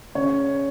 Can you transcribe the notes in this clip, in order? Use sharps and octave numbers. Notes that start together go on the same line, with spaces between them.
C#3 C#5